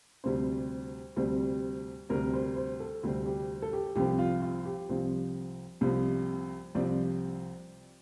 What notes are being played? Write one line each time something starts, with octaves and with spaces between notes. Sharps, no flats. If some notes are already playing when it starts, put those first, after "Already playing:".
D2 C3 G3 C4 C5
D2 C3 G3 C4
D2 C3 G3 C4 A#4
C5
C5
A4
D2 C3 G3 C4
G4
A4
G4
C2 C3 F3 C4 G4
F4
F4
G4
C2 C3 F3 C4 C5
C2 C3 F3 C4
C2 C3 F3 C4 D5